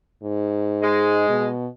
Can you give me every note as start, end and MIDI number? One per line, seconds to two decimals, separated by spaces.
0.23 1.26 44
0.82 1.48 56
1.30 1.67 47